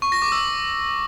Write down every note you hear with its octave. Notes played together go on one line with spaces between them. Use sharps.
C#6
A#6
D6
E6